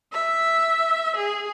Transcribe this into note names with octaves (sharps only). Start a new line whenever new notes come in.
E5
G#4